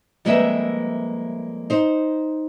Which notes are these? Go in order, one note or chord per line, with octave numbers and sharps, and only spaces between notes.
F2 G3 G#3 A#3 B4 E5
D#4 C5